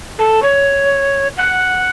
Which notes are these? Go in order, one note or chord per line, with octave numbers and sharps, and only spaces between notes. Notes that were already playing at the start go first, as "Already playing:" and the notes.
A4
C#5
F#5